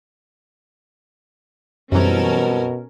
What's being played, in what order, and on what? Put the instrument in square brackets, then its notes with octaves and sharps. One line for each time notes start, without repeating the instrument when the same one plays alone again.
[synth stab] F#2 E3 [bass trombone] B2 [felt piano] G3 C4 [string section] C#4 A4 A#4